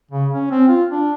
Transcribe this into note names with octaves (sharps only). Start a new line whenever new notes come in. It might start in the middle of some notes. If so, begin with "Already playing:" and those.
C#3
C#4
C4
F4
D4